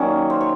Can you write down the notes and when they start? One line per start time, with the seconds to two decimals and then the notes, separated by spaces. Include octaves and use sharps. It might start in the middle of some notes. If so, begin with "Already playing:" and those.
Already playing: D#3 F#3 A#3 C#4 D5
0.30 C5
0.41 C#5